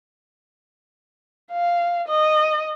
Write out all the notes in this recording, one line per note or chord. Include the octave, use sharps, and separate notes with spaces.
F5
D#5